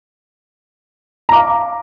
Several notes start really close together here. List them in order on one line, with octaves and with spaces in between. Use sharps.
A#5 D6 F5